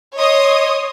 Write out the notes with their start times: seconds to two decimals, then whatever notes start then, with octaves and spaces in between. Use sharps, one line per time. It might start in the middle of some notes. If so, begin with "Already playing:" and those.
0.17 C#5 D#5 C6 D#6